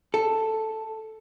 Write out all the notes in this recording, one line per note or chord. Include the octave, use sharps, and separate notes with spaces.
A4